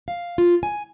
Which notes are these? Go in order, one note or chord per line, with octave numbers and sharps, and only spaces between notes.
F5
F4
G#5